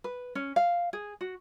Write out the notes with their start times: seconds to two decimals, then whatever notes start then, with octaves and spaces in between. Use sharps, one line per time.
0.04 B4
0.35 C#4
0.56 F5
0.93 G#4
1.21 F#4